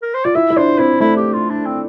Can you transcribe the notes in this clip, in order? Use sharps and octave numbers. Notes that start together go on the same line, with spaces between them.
A#4
C5
F4 D5
E4 E5
E4
D4 C5
C4 E4
A3 E4
G4
F4
D4
C4